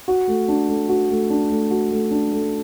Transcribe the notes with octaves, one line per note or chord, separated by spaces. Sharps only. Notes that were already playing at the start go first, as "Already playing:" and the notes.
F#4
A3
D4
A3
F#4
A3
D4
A3
F#4
A3
D4
A3